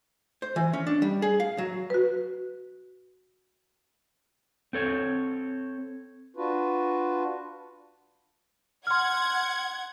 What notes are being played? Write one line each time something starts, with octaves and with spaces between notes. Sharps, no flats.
C5
E3
C#4
D4
G3
G#4
F5
F#3
F#4 B4
C4 A4 C#5
D4 F4 F#4 B4
F#5 C6 F6 G#6